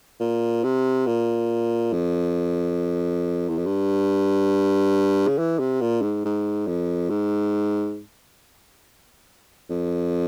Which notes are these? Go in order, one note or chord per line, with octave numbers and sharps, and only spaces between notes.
A#2
C3
A#2
F2
E2
F2
G2
C#3
E3
C3
A#2
G#2
G#2
F2
G#2
F2